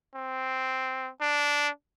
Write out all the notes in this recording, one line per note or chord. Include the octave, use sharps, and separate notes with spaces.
C4
D4